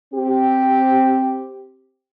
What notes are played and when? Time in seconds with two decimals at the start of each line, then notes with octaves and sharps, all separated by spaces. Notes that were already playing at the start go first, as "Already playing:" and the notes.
0.13 C4 G4